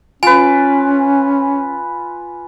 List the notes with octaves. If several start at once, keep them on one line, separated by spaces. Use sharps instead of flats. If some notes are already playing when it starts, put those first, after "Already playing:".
C#4 F4 B4 G#5